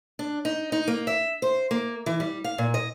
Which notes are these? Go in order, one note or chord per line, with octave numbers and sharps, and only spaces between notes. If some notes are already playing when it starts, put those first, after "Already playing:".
D4
D#4
D#4
A#3
E5
C5
A#3
E3
G3
F5
A#2
D#5